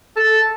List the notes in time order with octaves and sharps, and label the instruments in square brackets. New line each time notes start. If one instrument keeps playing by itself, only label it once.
[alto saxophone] A4